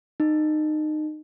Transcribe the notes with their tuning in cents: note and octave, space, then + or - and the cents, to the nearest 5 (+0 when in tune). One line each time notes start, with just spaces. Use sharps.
D#4 -25